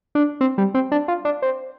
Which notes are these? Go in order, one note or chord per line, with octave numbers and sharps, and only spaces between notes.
D4
C4
G3
C4
D4
F4
D4
C4